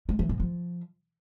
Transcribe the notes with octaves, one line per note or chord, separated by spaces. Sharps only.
G#3
E3
G#2
F3